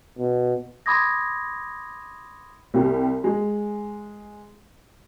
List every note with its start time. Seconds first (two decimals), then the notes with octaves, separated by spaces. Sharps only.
0.18 B2
0.86 B5 C6 D6 D#6 G#6 A#6
2.74 C2 G4
3.24 G#3